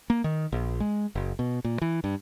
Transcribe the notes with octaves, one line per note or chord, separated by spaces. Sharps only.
A#3
D#3
A#1
G#3
F#1
B2
A#2
E3
G2